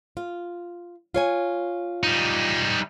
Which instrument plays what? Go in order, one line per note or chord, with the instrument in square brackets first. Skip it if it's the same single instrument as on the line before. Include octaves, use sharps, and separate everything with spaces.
[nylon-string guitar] F4
F4 C#5 G#5
[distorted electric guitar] G3 D#4